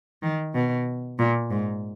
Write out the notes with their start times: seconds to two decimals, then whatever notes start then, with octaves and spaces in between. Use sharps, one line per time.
0.23 D#3
0.54 B2
1.19 A#2
1.50 G#2